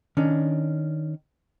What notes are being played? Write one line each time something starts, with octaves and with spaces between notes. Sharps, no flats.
D#3 C#4 D4